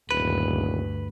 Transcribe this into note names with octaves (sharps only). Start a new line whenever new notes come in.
D#1 D2 G2 B4